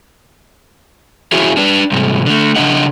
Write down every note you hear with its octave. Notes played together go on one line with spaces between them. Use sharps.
E4 F#4 G#4 C#5 E5
D4 B4
G#2 C3 G3 C4
D3 A3
C#3 E3 D4 D#5 F#5